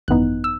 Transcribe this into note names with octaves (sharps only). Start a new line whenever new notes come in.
G#1 F#2 E3 B3 D#4 F#6
E6